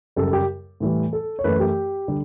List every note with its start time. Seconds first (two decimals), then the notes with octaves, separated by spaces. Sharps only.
0.16 F#2 C#3 G3 A4
0.33 G4
0.80 A2 E3 G3
1.13 A4
1.39 C#5
1.44 F#2 E3 A3 B4
1.60 G4
2.08 D3 G3